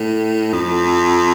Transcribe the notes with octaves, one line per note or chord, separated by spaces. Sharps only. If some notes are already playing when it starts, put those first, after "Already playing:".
Already playing: A2
F2